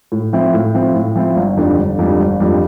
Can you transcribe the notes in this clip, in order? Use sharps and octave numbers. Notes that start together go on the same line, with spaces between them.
A2
F3 C4 E4
A2
F3 C4 E4
A2
F3 C4 E4
G1
F2 D3 G3
G1
F2 D3 G3
G1
F2 D3 G3